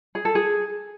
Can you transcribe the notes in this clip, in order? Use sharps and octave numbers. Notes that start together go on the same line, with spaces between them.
G#4
A4
G#4